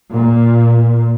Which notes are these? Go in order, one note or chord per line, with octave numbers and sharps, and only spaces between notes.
A#2